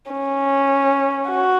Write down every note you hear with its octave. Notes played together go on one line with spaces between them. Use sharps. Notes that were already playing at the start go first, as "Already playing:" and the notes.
C#4
F#4